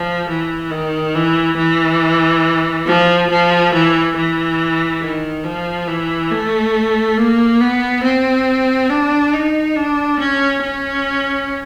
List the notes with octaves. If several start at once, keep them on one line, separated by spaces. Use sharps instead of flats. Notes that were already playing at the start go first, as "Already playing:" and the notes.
Already playing: F3
E3
D#3
E3
E3
F3
F3
E3
E3
D#3
F3
E3
A3
A#3
B3
C4
D4
D#4
D4
C#4
C#4